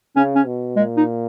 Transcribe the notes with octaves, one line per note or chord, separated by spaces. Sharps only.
C#3 C#4
C#4
B2
A#2 G#3
D#4